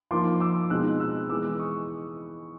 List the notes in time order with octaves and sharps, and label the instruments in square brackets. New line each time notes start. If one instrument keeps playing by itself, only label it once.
[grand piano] F3 A#3 D#4 C6 D6
D6 E6
B2 G#3 C4 D#4 E6 F#6
E6 F#6
E3 G#3 B3 D6 E6
C#6 D#6